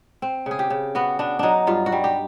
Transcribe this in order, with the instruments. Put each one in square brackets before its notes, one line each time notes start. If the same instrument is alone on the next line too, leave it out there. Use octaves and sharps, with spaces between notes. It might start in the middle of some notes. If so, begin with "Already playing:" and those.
[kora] C4
C#3 G#4
G4
C#3
B3 F#4
B3 D4
F#3 D4 D#4
G2 F4
F#4
G3
G4